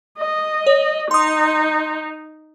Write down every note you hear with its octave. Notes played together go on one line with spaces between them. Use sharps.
D#5
C#5
D#4 C6 D#6